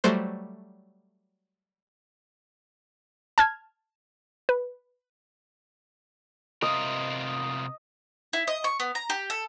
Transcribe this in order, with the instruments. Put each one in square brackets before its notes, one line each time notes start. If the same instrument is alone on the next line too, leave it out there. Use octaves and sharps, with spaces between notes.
[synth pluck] F#3 G3 A3 F#4 C5
[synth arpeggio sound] A5 F6 G#6
B4
[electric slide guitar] C3 F4 A#4 [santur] D#5
[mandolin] E4
D#5
C#6
B3
A#5
G4
A4